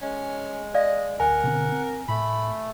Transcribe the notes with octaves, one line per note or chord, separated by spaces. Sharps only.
G#3 C#4
D5 D#5 F5
D1 A#4 F#5 G#5
B2 D3 C4
C4
A2 A3 B5